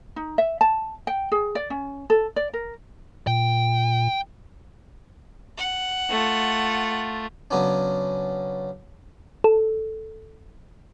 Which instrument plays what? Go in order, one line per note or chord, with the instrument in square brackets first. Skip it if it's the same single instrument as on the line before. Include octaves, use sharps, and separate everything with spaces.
[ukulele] D#4
E5
A5
G5
G#4
D5
C#4
A4
D5
A#4
[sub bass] A#2 [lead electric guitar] G5
[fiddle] F#5
[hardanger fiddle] A3 F4
[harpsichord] C#3 F#3 B3 C#4 D4
[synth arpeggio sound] A4